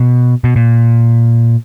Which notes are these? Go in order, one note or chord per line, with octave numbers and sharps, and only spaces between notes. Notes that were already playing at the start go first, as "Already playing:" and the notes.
Already playing: B2
B2
A#2